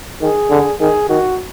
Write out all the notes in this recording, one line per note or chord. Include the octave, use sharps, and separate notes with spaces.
D#3 G#4
D3
D#3 G#4
D#3 F#4